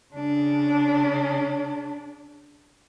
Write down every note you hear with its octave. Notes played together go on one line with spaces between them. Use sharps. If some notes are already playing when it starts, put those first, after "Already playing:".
C#3 D4